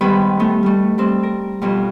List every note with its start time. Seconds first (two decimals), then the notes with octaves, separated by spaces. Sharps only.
0.01 G#2 D#3 G3 B3 B4 B5
0.39 A3 B3 D#4
0.63 G3 A3
0.98 G3 C4
1.23 A#4
1.62 F2 B2 G3